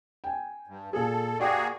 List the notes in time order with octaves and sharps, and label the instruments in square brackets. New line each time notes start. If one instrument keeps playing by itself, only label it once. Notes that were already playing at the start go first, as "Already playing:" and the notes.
[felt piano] G5 G#5
[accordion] G2
[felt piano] A#2 G#4 [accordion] A4
[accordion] A#3 F#4 G#4 [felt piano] D5 G5 D6